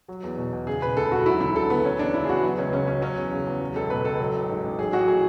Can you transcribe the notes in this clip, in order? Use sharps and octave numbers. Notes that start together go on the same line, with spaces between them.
F#3
E2
B2
E2
C#3 G#4
E1 B4
D2 A4
E1 F#4
F#3 E4
D2 E4
D3 A4
D2 B3
F#3 C#4
E2 D4
C#3 E4
G#4
E2 F#4
F#3 B3
C#2 C#4
C#3 C#4
C#2 C#4
F#3 C#4
E2
C#3
E2
F#3
C#2 A4
B2 B4
C#2 A4
F#3
A1
G#2
A1
F#3 G#4
A1 F#4
A2 G#4